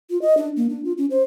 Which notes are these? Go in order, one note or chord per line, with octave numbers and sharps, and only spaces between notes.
F4
D#5
D4
A#3
D4
F4
C#4
C5